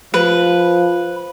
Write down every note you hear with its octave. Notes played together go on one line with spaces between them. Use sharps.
F3 B4